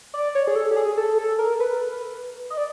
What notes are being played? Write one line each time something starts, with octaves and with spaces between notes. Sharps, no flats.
D5
C#5
G#4
A4
G4
G#4
A4
A4
A#4
B4
D#5
D5